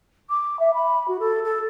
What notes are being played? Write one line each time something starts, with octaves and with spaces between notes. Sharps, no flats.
D6
E5
B5
F#4
A4
A4